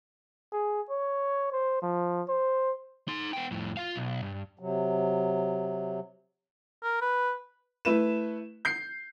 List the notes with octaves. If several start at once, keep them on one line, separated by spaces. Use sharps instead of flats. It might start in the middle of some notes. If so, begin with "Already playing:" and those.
G#4
C#5
C5
F3
C5
D#4 C6
B3 G5
F2 A2
F4 F5
B1
G2
C3 F#3
A#4
B4
A3 E4 B4 E7
G6 C7